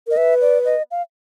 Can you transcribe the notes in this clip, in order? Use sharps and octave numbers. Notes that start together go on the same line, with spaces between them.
A#4 D#5
B4 E5
D5
D#5
F5